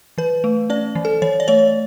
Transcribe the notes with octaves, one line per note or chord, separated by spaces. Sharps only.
E3 B4
A3
C#4 D5
E3
A4
E3 C#5
D5
A3 C#5